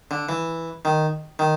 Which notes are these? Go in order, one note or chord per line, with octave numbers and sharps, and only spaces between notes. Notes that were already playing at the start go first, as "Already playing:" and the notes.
D3
E3
D#3
D#3